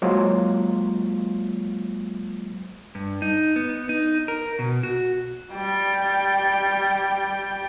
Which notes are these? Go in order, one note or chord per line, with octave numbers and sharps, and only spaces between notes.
F#3 G#3 A#3 F4 C5
G2
D#4
B3
D#4
A#4
B2
F#4
G3 G5